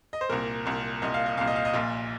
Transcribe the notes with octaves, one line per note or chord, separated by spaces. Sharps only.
D#5
C5
C2 A#2 A#4
C2 A#2
C2 A#2 D#5
F5
D#5
C2 A#2 F5
D#5
F5
D#5
A#1 A#2 F4